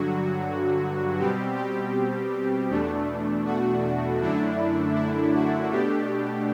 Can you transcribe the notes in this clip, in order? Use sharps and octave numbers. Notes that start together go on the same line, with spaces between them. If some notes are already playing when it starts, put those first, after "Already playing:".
Already playing: G2 D3 F#3 F#4
B2 G3 C4 G4
G4
E2 B2 A3 D4
F#4
F#2 D3 A3 D4 E4
E4
F#4
B2 A3 D4 G4